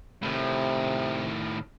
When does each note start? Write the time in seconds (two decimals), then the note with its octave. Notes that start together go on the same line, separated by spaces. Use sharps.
0.23 A2 C3 D#3